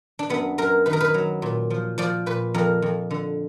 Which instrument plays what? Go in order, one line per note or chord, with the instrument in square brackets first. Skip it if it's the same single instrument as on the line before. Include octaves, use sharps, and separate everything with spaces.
[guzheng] D4
F#2 B3
F#2 A#4
D#3 B4
A#4
B4
F#3
A#2
F3
F3 D5
A#2 B4
F2 A#4
F2
D3